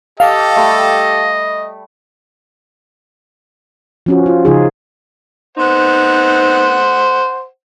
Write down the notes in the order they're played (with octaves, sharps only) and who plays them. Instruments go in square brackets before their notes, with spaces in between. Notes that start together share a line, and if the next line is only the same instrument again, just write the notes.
[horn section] G4 A4 [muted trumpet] D#5 [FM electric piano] F5
[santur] G3 A3
[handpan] F3 C#4 F#4
F4
C#3 F3 D#4 F4 G#4
[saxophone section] B3 C4 D#4 [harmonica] C5 F#5